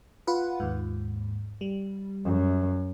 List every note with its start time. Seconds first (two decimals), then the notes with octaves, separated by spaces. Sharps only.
0.27 F4 B4 F#5
0.60 D#2 G#2
1.61 G3
2.25 F#2